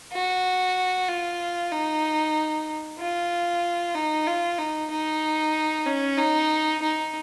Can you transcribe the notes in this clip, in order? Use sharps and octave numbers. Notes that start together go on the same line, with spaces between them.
F#4
F4
D#4
F4
D#4
F4
D#4
D#4
C#4
D#4
D#4